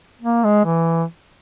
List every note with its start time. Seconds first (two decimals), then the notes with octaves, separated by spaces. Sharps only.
0.21 A#3
0.44 G#3
0.65 E3